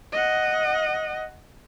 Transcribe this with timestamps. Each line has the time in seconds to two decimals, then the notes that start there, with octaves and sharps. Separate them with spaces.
0.13 D#5 F#5